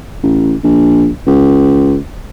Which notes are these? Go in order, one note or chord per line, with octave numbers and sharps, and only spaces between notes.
A1
A#1
C#2